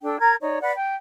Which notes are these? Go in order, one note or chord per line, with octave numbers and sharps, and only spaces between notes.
D4 A4 G5
A#4 A#5 G#6
D#4 C#5 D5
B4 D5 F#5 B5
G5